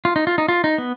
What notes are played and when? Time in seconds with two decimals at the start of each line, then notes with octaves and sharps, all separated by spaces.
0.05 F4
0.16 D#4
0.27 F4
0.38 D#4
0.48 F4
0.64 D#4
0.78 B3